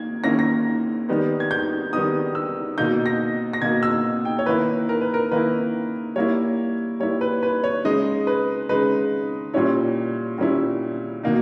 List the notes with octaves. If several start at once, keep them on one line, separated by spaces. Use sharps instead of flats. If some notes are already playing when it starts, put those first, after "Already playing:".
Already playing: D#3 A#3 G#6
D#3 A#3 C#4 E4 A#6
A#6
D#3 G3 B3 D#4
G#6
G6
D#3 G3 B3 D#4 D#6
E6
B2 A#3 D#4 G6
A#6
A#6
B2 A#3 D#4 G#6
E6
G5
C#5
D#3 A#3 E4 B4
A#4
B4
A#4
D#3 A#3 E4 B4
G3 A#3 E4 C#5
G3 A#3 E4 C#5
B4
B4
C#5
C#3 G#3 D#4 D#5
B4
C#3 G#3 D#4 B4
A#2 G3 C#4 E4 C#5
A#2 G3 C#4 E4
B2 A#3 D#4